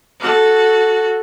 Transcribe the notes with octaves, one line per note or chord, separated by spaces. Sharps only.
F#4 A4